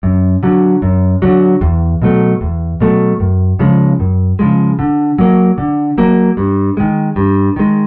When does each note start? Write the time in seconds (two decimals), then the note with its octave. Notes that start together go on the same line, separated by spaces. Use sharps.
0.03 F#2
0.43 D3 F#3
0.82 F#2
1.22 D3 F#3
1.61 E2
2.02 B2 F#3 A3
2.41 E2
2.81 B2 F#3 A3
3.20 F#2
3.59 C#3 F3 G#3
4.00 F#2
4.39 C#3 F3 G#3
4.79 D3
5.18 F#3 A#3
5.58 D3
5.98 F#3 A#3
6.37 G2
6.77 D#3 G#3
7.16 G2
7.56 D#3 G#3